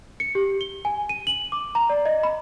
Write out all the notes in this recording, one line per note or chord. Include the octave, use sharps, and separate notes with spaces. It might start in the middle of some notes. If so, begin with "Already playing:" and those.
C#7
G4
G7
G#5
D#7
F#7
D6
A#5
D5
D#5
B5